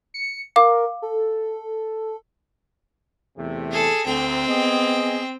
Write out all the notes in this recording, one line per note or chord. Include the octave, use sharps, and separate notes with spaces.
C#7
A#4 F5 D6
A4
E2 C3 A3
G#4 A4
D2 C4 G5
B3 G#4 D#5